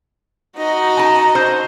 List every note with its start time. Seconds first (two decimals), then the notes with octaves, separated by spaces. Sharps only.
0.58 D#4 F#4 D#5
0.97 A5 A#5
1.35 C5